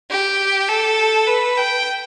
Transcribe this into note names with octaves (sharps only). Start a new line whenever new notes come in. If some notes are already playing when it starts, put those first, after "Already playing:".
G4
A4
B4
G5